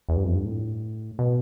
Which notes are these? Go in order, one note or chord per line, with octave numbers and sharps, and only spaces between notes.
E2
G2
F2
G2
A2
B2